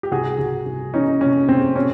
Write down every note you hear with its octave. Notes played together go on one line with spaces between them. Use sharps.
G4
C2 F#4 G#4
C2
C2
E3 C#4 D#4
C3 C#4
C3 C4
B2 C#4